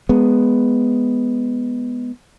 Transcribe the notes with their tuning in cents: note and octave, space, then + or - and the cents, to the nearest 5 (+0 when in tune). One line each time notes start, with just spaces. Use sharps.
G#3 +0 B3 +0